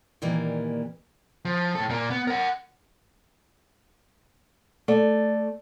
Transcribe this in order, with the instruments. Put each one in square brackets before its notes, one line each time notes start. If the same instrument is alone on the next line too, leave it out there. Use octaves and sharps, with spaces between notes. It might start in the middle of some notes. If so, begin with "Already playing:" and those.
[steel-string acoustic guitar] A#2 D#3 E3 G3 A#3
[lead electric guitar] F3
A2 A4
A#2 A#3
B3
A#4 F#5
[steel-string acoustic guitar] A3 D5